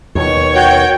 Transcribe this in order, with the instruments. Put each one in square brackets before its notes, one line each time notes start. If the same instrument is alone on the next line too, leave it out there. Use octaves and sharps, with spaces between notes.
[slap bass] D#2 B2 [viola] C#5 C#6
[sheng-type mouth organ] F#4 [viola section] G5